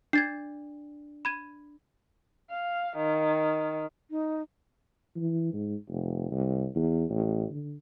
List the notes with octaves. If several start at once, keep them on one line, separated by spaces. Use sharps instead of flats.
D4 G#6 A6 C7
B5 G#6 D#7
F5
D#3
D#4
E3
G#2
F1
C2
E2
A1
D3